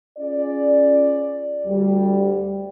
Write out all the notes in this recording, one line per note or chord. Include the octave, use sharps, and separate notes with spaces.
C#4 F4 G#4 D5
D2 G3